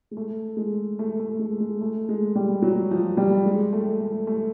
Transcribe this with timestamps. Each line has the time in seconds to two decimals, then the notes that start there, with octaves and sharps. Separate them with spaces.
0.11 G#3
0.17 A3
0.57 G#3
0.99 A3
1.19 A3
1.39 G#3
1.60 G#3
1.81 A3
2.09 G#3
2.36 G3
2.62 F#3
2.91 F3
3.17 G3
3.46 G#3
3.73 A3
4.00 A3
4.27 A3